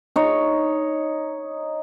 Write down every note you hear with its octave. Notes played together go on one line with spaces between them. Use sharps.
D#4 C#5